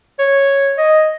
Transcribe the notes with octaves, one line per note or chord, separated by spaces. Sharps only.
C#5
D#5